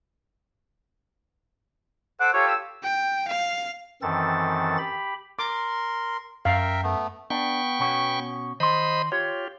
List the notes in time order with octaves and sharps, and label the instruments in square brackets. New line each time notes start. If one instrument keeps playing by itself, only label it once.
[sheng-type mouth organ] A4 C5 D6 [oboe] F#5
[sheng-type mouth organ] F4 G4 A4 [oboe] C#5
[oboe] E6
[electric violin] G5
F5
[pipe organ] F#2 D#3 E3 C4 A4 A6
G4 B5
[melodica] A#4 C6 [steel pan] D6
[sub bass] F#2 [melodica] A#4 E5 G5 [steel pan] F5
[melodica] A3 B3
[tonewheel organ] B3 G5 C#6 [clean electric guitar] D4
[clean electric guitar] B2 C#4 F#4
[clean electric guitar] D#3 C6 [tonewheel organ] C5 D#5 B5
[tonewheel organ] F4 G4 [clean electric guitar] C#5